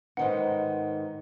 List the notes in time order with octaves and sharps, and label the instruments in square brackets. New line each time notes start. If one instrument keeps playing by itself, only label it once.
[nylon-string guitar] G#2 D#3 D#4 [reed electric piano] B4 C5 D#5 [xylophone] F#5